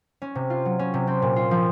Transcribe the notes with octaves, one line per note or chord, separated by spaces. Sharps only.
C#4
C3
F4
F#3
C#4
C3
C4
A#2
F4
F3